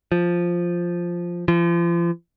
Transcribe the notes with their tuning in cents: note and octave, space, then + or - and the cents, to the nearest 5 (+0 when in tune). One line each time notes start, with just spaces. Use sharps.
F3 +0
F3 -35